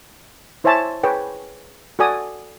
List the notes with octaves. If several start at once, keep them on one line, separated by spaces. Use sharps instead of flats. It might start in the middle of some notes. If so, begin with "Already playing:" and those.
E4 C5 C#5 E5 G#5 A5
G#4 B4 C#5 G5
F#4 A4 D5 G#5 D#6